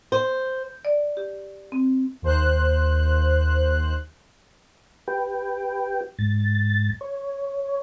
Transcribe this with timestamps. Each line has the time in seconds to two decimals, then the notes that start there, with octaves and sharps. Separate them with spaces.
0.12 C5
0.85 D5
1.17 G4
1.72 C4
2.22 D#2 C5 F#6
5.08 G4 B4 G5
6.19 G#2 A6
7.01 C#5